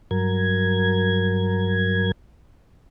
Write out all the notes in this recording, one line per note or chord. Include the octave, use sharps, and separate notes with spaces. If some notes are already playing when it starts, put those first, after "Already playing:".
G2 F#3 A#4 G#6